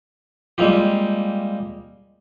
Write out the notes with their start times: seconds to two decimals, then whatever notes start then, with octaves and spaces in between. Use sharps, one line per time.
0.58 G3 G#3 A#3 C4 F4 G4